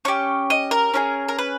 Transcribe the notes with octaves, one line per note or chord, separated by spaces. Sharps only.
C#4 G4 C#6
D#5
A#4
C#4 E4 G#4
A#4
B4